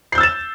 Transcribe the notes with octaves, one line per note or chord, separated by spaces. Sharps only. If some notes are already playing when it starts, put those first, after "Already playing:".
E6 G6 A6 C7 E7